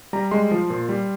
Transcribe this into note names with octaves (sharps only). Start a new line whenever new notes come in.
G3 A#5
G#3 C6
F3
A#2
G3